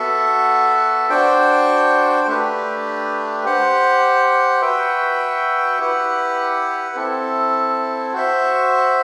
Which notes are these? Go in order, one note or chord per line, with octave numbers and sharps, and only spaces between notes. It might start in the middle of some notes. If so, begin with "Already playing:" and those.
Already playing: B3 F#4 A4 E5
D4 F#4 C5 G5
A3 D4 G4 B4
G4 C5 F#5
F#4 B4 E5 G5
E4 G4 B4 F#5
C4 E4 A4
F#4 C5 E5